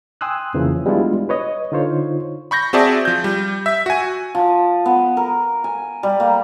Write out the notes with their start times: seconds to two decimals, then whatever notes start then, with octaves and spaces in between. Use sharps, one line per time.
0.21 G5 G#5 C6 D#6 E6 F#6
0.54 F2 C#3 E3 F3 A#3
0.86 G3 G#3 B3 D4 E4 F4
1.29 B4 C#5 D#5
1.72 D3 D#4 F4 C5 C#5
2.51 B5 C#6 G6 A#6
2.73 C4 F#4 G#4 D5 E5 A5
3.05 F3 G6
3.24 G3
3.66 E5
3.86 F#4 G#5
4.35 F3
4.86 B3
5.17 A#4
5.64 G#5
6.03 G3
6.20 A#3